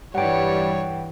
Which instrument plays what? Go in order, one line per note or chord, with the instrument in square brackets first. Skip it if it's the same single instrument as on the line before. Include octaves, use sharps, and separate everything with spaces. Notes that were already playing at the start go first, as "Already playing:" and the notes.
[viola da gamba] G2 E3 [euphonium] G3 [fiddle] C#5 [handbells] F#5 G5